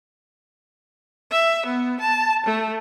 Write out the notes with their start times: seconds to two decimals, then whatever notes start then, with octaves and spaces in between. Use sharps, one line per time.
1.31 E5
1.65 B3
2.00 A5
2.46 A3